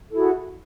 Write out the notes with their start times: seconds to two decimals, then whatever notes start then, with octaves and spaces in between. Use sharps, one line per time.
0.09 A4
0.11 E4
0.14 G#4
0.17 F#4